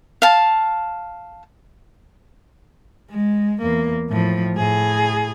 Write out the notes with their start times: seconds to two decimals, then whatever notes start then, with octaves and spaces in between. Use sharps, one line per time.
0.22 F5 A5
3.10 G#3
3.62 E2 A#3
4.10 A2 F3
4.57 A2 G#4